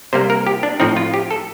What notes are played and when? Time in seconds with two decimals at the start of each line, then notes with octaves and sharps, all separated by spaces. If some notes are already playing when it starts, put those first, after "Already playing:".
0.13 C3 G3 A#3 C5
0.30 A#4
0.47 G4
0.63 D4
0.80 A2 F3 C4 D#4
0.97 F4
1.14 G4
1.31 A4